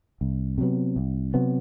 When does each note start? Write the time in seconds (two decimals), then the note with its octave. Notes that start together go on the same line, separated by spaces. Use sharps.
0.21 C2
0.58 C3 F#3 B3
0.96 C2
1.34 C3 F#3 B3